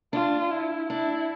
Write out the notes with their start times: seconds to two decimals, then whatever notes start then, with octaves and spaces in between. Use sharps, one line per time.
0.13 D4 F4
0.51 E4
0.90 D4 E4